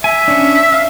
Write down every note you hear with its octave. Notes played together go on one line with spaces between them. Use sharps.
E5 G#5
C#4 D4
F5